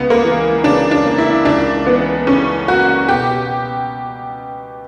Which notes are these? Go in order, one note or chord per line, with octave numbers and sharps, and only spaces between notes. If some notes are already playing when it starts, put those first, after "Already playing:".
Already playing: C#2 B3
A#3
E3
C#3 D4
D4
A#3
E4
C#2 D4
E3 B3
C#3 C#4
A#3 F#4
B2 G4